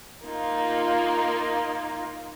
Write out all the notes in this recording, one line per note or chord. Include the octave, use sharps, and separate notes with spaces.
A#3 D#4 F4